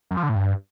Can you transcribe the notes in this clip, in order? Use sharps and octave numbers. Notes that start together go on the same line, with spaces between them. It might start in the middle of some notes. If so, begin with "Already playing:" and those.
F#2
F3
D3
A2
G2